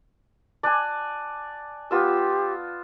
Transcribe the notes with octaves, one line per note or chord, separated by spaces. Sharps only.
D5 G#5 A5 D6 F#6
B3 F4 G4 E6